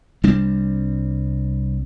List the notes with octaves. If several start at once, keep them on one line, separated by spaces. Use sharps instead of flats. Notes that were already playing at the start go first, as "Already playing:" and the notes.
C2 G3 C4 D4